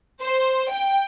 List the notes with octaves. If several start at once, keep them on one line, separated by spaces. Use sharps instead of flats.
C5
G5